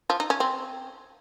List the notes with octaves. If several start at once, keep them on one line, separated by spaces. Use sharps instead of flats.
F3
D#4
C#4
C4